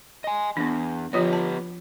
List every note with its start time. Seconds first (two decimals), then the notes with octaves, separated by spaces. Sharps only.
0.24 D#5 G#5
0.57 E2 B3 D4
1.13 F3 B3 F4 G4 C#5
1.33 A5